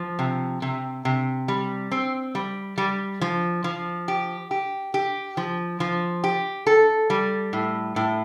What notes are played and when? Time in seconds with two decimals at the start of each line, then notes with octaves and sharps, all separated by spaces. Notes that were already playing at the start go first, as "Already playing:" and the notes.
Already playing: F3
0.19 C3
0.62 C3
1.05 C3
1.48 G3
1.91 C4
2.35 G3
2.78 G3
3.21 F3
3.64 F3
4.08 G4
4.51 G4
4.94 G4
5.37 F3
5.80 F3
6.24 G4
6.67 A4
7.10 G3
7.53 A2
7.96 A2